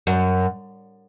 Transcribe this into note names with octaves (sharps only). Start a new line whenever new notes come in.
F#2